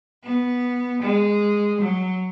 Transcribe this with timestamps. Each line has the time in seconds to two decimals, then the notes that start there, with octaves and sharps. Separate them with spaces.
0.24 B3
1.02 G#3
1.81 F#3